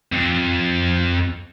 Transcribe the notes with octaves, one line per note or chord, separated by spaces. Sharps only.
F2